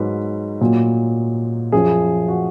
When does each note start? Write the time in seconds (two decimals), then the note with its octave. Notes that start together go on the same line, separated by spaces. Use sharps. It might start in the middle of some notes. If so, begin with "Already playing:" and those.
Already playing: G#2 F#3 B4
0.61 A#2 F#3
1.72 F#2 F3 G#4
2.28 F#4